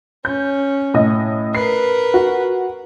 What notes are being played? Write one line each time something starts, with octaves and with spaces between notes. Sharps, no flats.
C#4 G6
A2 D#5
A#4 B4 C7
F#4